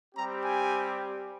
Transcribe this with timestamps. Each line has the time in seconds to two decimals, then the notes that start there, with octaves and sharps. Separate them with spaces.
0.15 G3 C4 G4 A#5
0.44 G#5